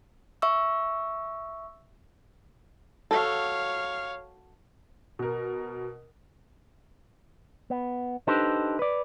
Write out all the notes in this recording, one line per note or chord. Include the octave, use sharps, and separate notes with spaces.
E5 C#6 E6
F#4 A4 C#5 F5
B2 A#4
B3
D4 D#4 G4 A4 B4 C5
B4 D5